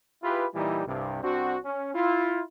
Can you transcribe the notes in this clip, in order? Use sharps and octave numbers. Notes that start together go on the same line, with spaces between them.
E4 F4 G4 G#4 B4
A#2 E3 G3 D#4 E4 G4
C2 G2 C3
C2 C4 D4 F#4
C#4
E4 F4